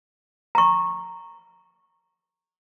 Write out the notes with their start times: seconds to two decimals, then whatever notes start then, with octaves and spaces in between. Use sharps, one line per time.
0.55 A#5 C#6